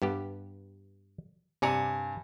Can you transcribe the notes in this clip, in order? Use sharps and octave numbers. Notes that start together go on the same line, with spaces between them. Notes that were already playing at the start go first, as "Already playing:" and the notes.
G2 B3 G4
G2 C3 D5 G#5 A#5 C#7